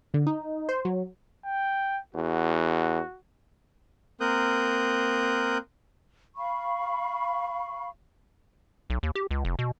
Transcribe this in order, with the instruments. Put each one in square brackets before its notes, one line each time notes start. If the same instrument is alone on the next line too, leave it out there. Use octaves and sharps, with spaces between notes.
[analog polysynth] D3
D#4
C5
F#3
[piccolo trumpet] G5
[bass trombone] E2 [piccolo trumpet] F#4
[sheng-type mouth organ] A#3 C4 A#4 D#6 F#6 G6
[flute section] F5 B5 C#6
[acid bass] B1
D#2
G4
C#2
F1
B2